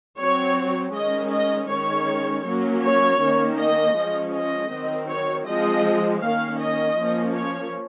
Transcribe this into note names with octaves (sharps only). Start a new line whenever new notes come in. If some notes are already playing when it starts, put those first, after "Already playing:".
F#3 C4 C#5
D#3 G#3 C#4 D#5
D#5
D#3 G#3 C#4 C#5
F#3 A#3 C#4
C#5
D#3 A#3 C#4
D#5
F3 G#3 C#4
D#5
D#3 F#3 C4
C#5
F3 G#3 C4 D#5
D#3 A#3 C#4 F5
D#5
F3 A#3 C#4
C#5